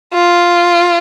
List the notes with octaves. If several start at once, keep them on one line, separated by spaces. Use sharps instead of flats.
F4